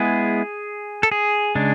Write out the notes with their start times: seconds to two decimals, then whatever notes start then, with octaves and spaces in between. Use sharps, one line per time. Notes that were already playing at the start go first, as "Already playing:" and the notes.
Already playing: G#3 B3 E4 G#4
1.03 A4
1.12 G#4
1.55 C#3 G#3 D4